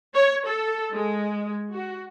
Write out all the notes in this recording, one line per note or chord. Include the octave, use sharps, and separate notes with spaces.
C#5
A4
G#3
F#4